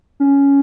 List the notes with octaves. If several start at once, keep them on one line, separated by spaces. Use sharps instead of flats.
C#4